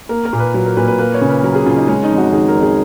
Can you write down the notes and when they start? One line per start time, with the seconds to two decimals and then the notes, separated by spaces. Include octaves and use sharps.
0.09 A#3 A#4
0.25 A#4
0.33 A#2
0.39 B4
0.54 F#3 B4
0.66 A#4
0.77 A#2 B4
0.88 B4
0.99 A#3 B4
1.14 C#5
1.21 C#3
1.29 B4
1.43 F#3 A#4
1.55 G#4
1.66 C#3 F4
1.77 D#4
1.88 G#3 C#4
2.03 D#4
2.11 F2
2.18 F#4
2.32 D#3 G#4
2.48 A#4
2.55 F2
2.63 G#4